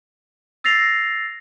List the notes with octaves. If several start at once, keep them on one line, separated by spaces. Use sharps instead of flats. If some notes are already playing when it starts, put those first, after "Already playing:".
E6 A6 A#6 C7 F7